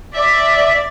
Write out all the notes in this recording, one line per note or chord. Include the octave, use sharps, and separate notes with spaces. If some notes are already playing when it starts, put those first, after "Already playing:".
D5 E5